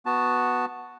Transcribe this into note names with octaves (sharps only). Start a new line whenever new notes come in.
B3 F#4 A5